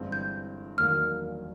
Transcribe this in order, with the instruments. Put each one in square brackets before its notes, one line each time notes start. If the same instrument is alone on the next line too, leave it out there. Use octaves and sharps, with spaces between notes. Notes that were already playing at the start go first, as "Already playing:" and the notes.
Already playing: [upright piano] G1 G2 E3 G#3 C4
[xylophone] G6
[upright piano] E1 D#2 D#3 F#3 A#3 [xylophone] F6